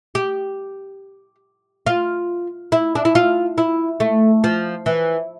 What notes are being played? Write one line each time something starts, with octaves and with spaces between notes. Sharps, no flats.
G4
F4
E4
D4
E4
F4
E4
A3
F3
E3